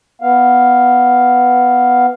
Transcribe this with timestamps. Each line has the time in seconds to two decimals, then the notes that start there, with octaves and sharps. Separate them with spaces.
0.22 B3 F5